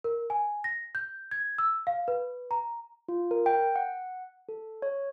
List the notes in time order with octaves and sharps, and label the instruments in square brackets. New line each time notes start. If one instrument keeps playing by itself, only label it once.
[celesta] A#4
G#5
A#6
G6
G#6
E6
F5
B4
A#5
[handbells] F4
A#4
G5
F#5
A4
C#5